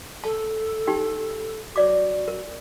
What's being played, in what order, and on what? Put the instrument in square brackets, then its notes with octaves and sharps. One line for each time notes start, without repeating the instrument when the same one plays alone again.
[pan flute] A4 [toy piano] A5
[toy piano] D#4 G4 G5
[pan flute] F#4 [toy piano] C#5 D5 D6
[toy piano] A#4